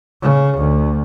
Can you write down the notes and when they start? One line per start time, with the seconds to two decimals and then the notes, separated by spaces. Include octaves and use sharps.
0.22 C#3
0.58 D2